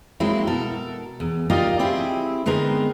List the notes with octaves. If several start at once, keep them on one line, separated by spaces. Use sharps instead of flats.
F#3 G#3 A#3 C4 E4
B2 A4 A#4
E2
D#4 F4 G4 A#4 D5 D#5
C4 E4 G4 G#4
D3 G#3 B3 C4 D#4 A#4